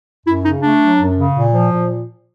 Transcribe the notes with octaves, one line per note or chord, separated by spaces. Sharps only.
F#2 E4
C#3 D#4
A3 D4
F#3
F#2
C#3
A#2
F3
A#2